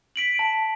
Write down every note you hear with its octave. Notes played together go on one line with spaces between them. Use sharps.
B6 D7 F#7
A5